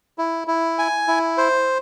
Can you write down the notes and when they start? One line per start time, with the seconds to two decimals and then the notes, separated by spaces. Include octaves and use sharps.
0.18 E4
0.47 E4
0.79 G#5
1.08 E4
1.38 C5